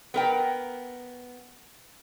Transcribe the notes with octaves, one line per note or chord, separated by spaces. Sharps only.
B3 A#4 G5